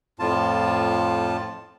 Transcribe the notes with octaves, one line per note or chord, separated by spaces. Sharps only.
F2 A2 F4 A5